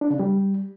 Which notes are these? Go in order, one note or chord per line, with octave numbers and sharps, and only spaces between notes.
D4
C#3
G3